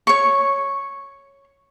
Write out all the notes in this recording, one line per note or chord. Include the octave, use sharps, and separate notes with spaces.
C#5 C#6